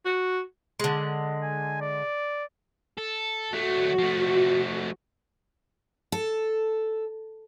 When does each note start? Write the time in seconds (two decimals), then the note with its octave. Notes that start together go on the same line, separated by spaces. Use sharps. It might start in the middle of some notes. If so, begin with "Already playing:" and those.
0.05 F#4
0.80 D3 G#3
1.43 G#5
1.81 D5
2.98 A4
3.53 F#3 A3 F#4
3.99 F3 A3
6.12 A4